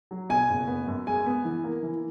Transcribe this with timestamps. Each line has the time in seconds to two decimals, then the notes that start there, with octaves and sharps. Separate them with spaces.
0.11 F#3
0.29 B2 G#5
0.49 F#1
0.68 B3
0.87 F#2
1.07 G#3 G#5
1.26 B3
1.45 E3
1.64 A#3
1.83 E3